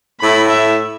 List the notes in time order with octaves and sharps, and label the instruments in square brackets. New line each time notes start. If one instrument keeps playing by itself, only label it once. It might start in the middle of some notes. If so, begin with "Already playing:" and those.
[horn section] A2 A3 E4 [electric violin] B5
[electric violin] E5